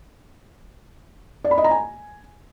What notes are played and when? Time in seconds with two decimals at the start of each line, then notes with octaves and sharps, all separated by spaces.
1.44 D5
1.51 B5
1.58 D#5
1.64 A#5
1.71 G#5